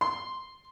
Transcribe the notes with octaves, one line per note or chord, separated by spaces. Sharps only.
C6